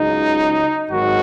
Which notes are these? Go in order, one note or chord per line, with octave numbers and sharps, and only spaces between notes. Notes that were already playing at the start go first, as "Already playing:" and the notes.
Already playing: C#2 C#3 F#3 D#4
G#1 G#2 D#3 F#3 F#4